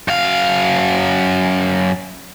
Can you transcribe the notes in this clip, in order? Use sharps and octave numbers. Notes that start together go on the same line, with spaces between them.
F#2 F5